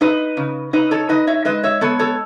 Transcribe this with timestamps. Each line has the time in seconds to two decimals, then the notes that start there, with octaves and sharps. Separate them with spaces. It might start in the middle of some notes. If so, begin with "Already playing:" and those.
0.01 D#4 B4 D#5
0.37 C#3
0.73 D#4 B4 D#5
0.91 A4 C#5
1.09 D#4 B4 D#5
1.27 C#5 E5
1.45 G#3 B4 D#5
1.63 C#5 E5
1.81 B3 A4 C#5
1.99 A4 C#5